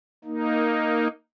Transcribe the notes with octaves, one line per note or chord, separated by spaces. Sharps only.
A#3 D#4